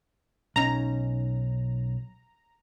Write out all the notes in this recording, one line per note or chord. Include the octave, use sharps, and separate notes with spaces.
B1 C#4 D#4 A#5